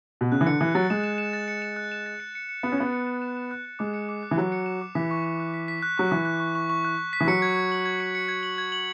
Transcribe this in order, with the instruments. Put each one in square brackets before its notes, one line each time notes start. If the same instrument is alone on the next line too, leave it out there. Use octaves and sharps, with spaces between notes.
[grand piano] B2
[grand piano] C#3 [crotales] F#6
[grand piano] E3
[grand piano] D3 [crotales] C#7
[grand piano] E3 [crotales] F#6
[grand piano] F#3 [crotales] A6
[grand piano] G#3 [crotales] E7
[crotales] E7
E7
A6
C#7
E7
F#6
E7
A6
C#7
C#7
C#7
[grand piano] B3 [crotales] C#7
[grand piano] C#4
[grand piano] B3 [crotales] E7
[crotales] C#7
E7
E7
E7
F#6
F#6
[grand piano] G#3 [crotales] D6
[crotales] C#7
D6
F#6
[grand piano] E3
[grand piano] F#3 [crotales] F#6
[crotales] C#7
E7
D6
[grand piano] E3 [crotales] B6
[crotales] C#6
C#6
F#6
B6
B6
F#6
[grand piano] F#3 [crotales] C#6
[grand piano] E3 [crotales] B6
[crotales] F#6
C#6
C#6
C#6
F#6
F#6
B6
[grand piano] E3
[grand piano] F#3 [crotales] C#7
[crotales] G#6
G#6
F#7
G#6
C#7
C#7
G#6
F#7
G#6
F#7